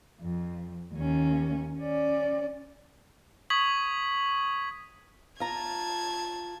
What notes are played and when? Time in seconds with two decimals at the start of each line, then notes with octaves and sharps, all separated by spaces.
0.21 F2
0.94 D#2 C#4
1.78 C#4 D5
3.50 C#6 D#6 G#6 B6 F#7
5.40 F4 A5 A#5 G#6